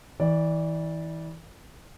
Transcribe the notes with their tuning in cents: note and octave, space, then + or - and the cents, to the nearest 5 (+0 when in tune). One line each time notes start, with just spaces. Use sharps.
E3 -30 D5 -5